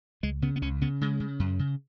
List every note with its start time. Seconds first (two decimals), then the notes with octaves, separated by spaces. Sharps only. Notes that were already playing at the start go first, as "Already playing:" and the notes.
0.23 C#2 G#3
0.42 C#3 B3
0.56 B3
0.62 C#2 C#4
0.81 C#3 B3
1.01 C#3 G#3
1.20 C#3
1.40 F#2
1.59 C#3